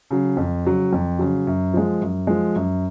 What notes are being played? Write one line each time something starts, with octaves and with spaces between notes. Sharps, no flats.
C#3 F#3
F2
C#3 F#3
F2
C#3 F#3
F#2
F3 G#3
F#2
F3 G#3
F#2